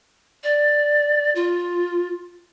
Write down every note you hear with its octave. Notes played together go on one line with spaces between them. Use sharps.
D5
F4